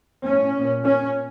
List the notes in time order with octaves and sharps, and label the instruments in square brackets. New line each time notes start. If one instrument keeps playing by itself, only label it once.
[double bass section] A2 C#4
A#2
A#2 C#4